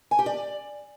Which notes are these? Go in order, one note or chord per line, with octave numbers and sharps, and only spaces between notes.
G#5
G4
D5